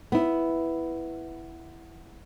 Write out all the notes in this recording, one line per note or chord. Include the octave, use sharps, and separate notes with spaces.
B3 E4